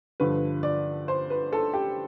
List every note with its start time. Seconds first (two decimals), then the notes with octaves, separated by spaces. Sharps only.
0.20 G2 D3 F3 B4
0.63 D5
1.08 C5
1.30 B4
1.53 A4
1.73 G4